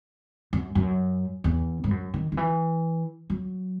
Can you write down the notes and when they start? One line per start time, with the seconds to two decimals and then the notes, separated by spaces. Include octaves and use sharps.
0.53 F#2
0.75 F#2
1.44 E2
1.84 G#2
1.91 F#2
2.14 D#3
2.32 D#3
2.37 E3
3.30 F#3